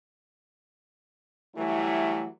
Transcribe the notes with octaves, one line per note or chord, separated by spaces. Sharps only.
E3 F#3 G3 A3 E4